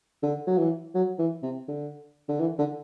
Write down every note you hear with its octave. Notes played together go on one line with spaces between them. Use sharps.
D3
F#3
E3
F#3
E3
C3
D3
D3
E3
D3